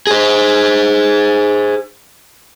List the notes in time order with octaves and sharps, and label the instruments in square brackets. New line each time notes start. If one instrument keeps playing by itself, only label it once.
[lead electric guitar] G#4 C5